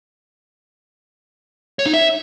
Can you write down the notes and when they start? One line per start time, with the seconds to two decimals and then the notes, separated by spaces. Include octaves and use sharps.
1.79 C#5
1.86 D#4
1.94 E5